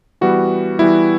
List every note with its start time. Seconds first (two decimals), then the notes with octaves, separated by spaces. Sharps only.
0.21 E3 G3 B3 F#4
0.79 E3 G3 B3 E4